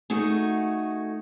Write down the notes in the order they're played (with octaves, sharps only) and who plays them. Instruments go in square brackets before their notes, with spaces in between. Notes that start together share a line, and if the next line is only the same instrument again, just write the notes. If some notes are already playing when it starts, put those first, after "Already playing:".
[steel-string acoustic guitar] A3 D#4 F#4 G#4